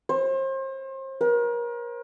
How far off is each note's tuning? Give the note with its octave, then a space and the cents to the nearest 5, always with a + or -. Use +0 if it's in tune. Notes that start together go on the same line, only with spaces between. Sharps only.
C5 +35
A#4 +35